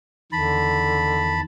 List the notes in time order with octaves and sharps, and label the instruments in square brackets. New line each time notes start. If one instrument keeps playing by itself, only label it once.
[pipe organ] E2 D#3 A5 [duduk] D3 [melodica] B5